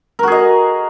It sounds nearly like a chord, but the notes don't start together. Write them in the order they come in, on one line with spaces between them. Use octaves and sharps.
A#4 F#4 G#4 D#5